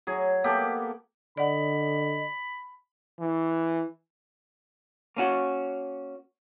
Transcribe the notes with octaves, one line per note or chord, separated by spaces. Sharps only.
F#3 G#4
A#3 B3 G4 A4
D3 D5 D#5 F#5 B5
E3
A#3 C#4 F#4